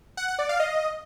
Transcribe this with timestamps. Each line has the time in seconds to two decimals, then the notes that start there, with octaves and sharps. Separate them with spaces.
0.17 F#5
0.28 F#5
0.39 D5
0.49 F5
0.60 D#5